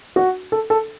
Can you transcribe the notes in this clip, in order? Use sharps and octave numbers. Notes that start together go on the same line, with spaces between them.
F#4
A4
A4